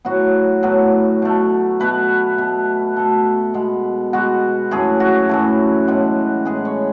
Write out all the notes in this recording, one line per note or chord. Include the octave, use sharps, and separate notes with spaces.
A2 F#3 B3 F#4
A2 F#3 B3
B2 A3
B2 A3 B4
B2 A3
B2 A3 A4
B2 G#3 B3
B2 G#3 B3 F#4
F#2 E3 A3 G#4
F#4
F#2 E3 A3
A2 G#3 B3
A2 G#3 B3 G#4
C#5